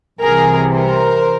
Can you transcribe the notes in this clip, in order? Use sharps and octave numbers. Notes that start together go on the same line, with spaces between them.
C2 C3 E3 G#4 A#4
A#4 C5